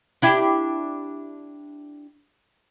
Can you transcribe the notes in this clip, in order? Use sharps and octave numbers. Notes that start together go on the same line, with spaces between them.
D4 E4 G4